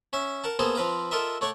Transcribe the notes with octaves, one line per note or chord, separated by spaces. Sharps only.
C#4 E5
A#4 F#5 A5
A#3 B3 G#4 A4 C5 A#5
F3 C4 B4 F5 A#5
F4 A4 A#4 D#5 E5
A3 C#5 D5 F#5 C#6